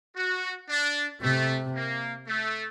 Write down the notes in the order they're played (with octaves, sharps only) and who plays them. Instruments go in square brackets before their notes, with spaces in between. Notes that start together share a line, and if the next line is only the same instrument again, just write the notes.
[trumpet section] F#4
D4
[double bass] C3 [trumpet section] A3
[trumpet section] A#3
A3